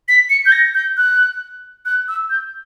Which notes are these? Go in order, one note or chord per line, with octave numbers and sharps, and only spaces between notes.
B6
C#7
G6
A#6
G6
F#6
F#6
E6
G6